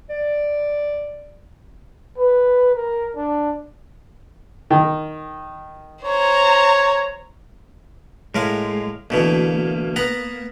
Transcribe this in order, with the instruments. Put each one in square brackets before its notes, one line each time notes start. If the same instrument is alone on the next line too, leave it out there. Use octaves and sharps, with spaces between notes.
[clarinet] D5
[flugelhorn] B4
A#4
D4
[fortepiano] D#3
[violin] C5 A#5 [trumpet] C#5
[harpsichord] A2 A#4 F5 [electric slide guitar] G#3
[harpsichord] D2 B2 E3 [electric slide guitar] A#3
[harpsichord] B3 F#5 A#5